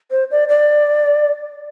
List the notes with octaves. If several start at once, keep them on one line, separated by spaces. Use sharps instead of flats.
C5
D5
D5